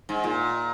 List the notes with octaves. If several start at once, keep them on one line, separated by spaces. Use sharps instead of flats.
G#2
A#2